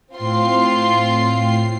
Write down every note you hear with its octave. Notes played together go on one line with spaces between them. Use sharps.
A2 C4 F4 C6 C7